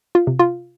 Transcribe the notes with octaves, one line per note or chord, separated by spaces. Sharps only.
F4
C3
F4